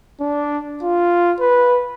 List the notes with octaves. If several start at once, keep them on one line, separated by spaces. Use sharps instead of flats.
D4
F4
B4